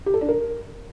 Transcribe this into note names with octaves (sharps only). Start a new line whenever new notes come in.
G4
A4
D4
A#4